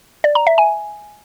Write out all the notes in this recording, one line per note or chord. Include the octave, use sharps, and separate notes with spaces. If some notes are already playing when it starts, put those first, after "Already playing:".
D5
A#5
E5
G#5